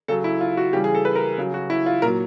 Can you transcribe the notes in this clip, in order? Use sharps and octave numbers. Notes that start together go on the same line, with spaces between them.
C#3 F#3 A4
E4
F4
F#4
C#3 E3 G3 G4
G#4
A4
B4
A#4
C#3 F#3
F#4
E4
F4
A#2 F#3 A#4